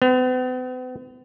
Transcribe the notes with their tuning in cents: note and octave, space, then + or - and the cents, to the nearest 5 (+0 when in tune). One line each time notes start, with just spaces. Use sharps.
B3 +45